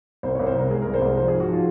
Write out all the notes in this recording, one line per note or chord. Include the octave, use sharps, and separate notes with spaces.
C2 C5
C2 C#5
C5
C2 A#4
G#3 G#4
C2 A#4
C5
C2
F3 C5
G#4
G#2
F#4
F3 F4